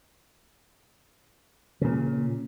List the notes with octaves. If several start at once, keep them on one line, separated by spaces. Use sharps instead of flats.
A#2 C#3